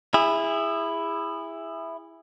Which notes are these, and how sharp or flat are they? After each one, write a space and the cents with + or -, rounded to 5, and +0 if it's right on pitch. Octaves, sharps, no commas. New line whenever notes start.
E4 +5 G#4 -25